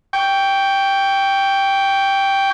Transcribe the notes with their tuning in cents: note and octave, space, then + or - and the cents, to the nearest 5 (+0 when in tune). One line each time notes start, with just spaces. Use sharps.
G5 +0 C#6 +30